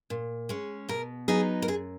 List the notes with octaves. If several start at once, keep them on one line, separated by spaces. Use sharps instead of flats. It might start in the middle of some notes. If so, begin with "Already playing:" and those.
A#2
G#3 C#4
B2 A#4
F#3 B3 D#4 G#4
A#4
F#2 G#4